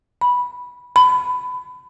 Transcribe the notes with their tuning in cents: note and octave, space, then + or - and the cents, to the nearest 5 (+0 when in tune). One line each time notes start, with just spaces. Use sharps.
B5 -5
B5 +25